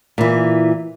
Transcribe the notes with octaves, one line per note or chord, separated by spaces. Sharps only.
A#2 E3